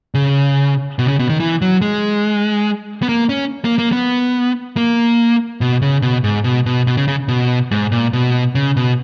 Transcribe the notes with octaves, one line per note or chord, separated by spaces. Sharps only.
C#3
B2
C#3
B2
D#3
E3
F#3
G#3
B3
A#3
C#4
A#3
A#3
B3
A#3
B2
C#3
B2
G#2
B2
B2
B2
C#3
C#3
B2
G#2
A#2
B2
C#3
B2